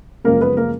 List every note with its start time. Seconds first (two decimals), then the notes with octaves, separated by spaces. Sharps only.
0.24 F#2 C#3 F3 G#3 A#3 A#4
0.41 B3 B4
0.57 A#3 A#4